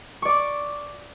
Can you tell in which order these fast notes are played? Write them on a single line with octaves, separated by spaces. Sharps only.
C#6 D5 D6